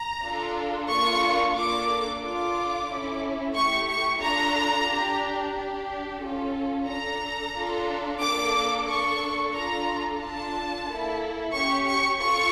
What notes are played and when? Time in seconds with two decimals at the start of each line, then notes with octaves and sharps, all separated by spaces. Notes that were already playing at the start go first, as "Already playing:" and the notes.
Already playing: A#5
0.22 D4 F4 A4
0.89 A#3 D4 F4 A4 C#6
1.55 A#3 D4 A4 D6
2.22 D4 F4 A4 D6
2.88 C#4 E4 A4
3.55 A3 E4 G4 C#6
3.88 C#6
4.21 D4 F4 A4 A#5
4.88 D4 G4
5.54 D4 G4
6.21 C#4 F4 A4
6.87 D4 A4 A#5
7.54 D4 F4 A4
8.20 A#3 D4 A4 D6
8.87 A#3 D4 A4 C#6
9.53 D4 F4 A4 A#5
10.20 D4 F4 A4 A5
10.87 A#3 E4 A4
11.53 C#4 G4 C#6
11.87 C#6
12.19 F4 A4 C#6